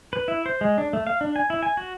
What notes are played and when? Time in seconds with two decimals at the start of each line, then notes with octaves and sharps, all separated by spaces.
0.13 B4
0.28 E4
0.46 C5
0.61 G#3
0.78 D4
0.93 A3
1.07 F5
1.21 D4
1.36 G#5
1.50 E4
1.63 G#5
1.77 F#4